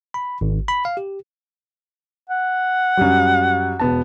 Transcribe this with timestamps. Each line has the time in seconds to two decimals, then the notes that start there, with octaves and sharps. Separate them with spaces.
0.14 B5
0.41 G#1
0.68 B5
0.85 F5
0.97 G4
2.29 F#5
2.97 F#2 G3
3.80 E1 B3 A5